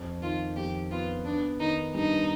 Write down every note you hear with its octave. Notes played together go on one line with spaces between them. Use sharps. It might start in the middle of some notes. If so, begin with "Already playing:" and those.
Already playing: F2
D#3 F4
F2 G4
B3 F4
B3 D4
D#3 D#4
G2 D#4